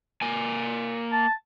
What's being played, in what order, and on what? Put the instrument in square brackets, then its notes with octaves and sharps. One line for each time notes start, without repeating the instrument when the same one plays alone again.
[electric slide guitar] A#3 G#5
[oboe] A5